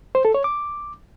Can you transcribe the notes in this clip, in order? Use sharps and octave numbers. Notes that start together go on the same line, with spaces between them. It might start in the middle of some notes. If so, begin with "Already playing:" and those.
C5
A4
C#5
D6